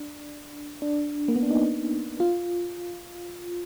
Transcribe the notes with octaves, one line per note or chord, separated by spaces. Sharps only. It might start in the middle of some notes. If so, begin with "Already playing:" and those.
Already playing: D4
D4
A#3
B3
D4
D#4
F4